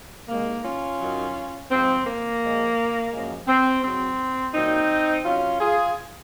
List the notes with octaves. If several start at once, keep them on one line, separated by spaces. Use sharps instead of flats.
C3 D#3 G#3 A#3
C#4 F4
F#2 D#3 F#3
G#2 F3 G#3 C4
A#3
A#2 F3 G#3
F#2 F3 G#3
C4
G#2 F#3 C4
A#2 F#3 C4 D#4
C3 F#3 C#4 F4
F4 G#4